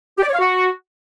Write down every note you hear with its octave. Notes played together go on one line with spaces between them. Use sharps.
G4
D5
C#5
F5
F#4